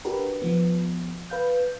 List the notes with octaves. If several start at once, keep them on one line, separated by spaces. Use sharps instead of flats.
D4 F#4 G4 A#4 B4
F3 B3
B4 F5 G6